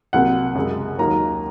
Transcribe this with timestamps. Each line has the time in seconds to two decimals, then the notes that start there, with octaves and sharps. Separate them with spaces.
0.13 C2 C3 F#3 A#3 F#5
0.55 F#2 C#3 G#3
0.99 D#2 D#3 F#3 A#3 A#5